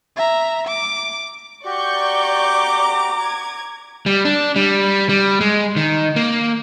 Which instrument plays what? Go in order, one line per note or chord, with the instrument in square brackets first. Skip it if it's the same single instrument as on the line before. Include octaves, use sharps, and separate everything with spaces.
[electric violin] E5 A#5
D6
[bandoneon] F#4 G4 [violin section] D5 C#6 G6
[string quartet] A#5 D6
[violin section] G#6
[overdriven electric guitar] G3
D4
G3
G3
G#3
D#3
A#3